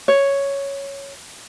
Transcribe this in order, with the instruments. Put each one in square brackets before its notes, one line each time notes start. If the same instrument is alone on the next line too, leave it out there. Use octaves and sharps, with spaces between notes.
[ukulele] C#5